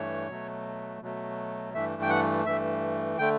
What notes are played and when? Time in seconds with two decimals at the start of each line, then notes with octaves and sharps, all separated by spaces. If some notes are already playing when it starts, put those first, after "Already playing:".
Already playing: G2 E3 A3 C#5
0.29 B2 F#3 A3
1.02 B2 F#3 A3
1.74 G2 E3 A3 E5
2.02 G5
2.10 F#5
2.46 G2 E3 A3 E5
3.19 D3 A3 G5